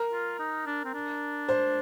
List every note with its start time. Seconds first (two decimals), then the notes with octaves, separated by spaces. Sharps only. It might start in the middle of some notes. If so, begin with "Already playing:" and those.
Already playing: A#4
0.12 F4
0.39 D#4
0.66 D4
0.85 C4
0.94 D4
1.49 C5